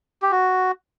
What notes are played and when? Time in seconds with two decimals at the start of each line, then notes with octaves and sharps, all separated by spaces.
0.22 G4
0.31 F#4